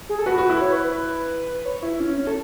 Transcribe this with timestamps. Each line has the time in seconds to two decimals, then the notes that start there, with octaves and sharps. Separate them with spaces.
0.09 G#4
0.19 A4
0.26 F#4 B4
0.38 F#4
0.50 E4
0.55 B4
0.61 C#5
0.72 B4
0.84 B4
1.65 C#5
1.83 E4
2.00 C#4
2.17 C#4
2.27 A4